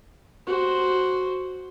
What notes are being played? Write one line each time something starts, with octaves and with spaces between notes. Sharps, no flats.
F#4 C5